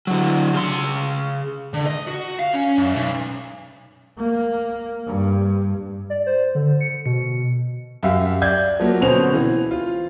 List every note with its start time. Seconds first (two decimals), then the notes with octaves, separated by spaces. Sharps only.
0.07 D3 F#3
0.54 C#3 C6
1.74 D3
1.87 D#5
2.08 F#4
2.39 F5
2.53 C#4
2.78 F#2
2.96 B1
4.19 A#3
5.07 G2
6.10 D5
6.27 C5
6.55 D3
6.81 C#7
7.06 B2
8.03 F#2 G4 E5 F5
8.42 D5 G6 G#6
8.80 F3 F#3 A#3
9.01 B2 D3 C4 C#4 C5 F7
9.33 E3
9.71 F4